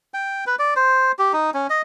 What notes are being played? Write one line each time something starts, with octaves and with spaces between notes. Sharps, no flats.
G5
B4
D5
C5
G4
D#4
C#4
D#5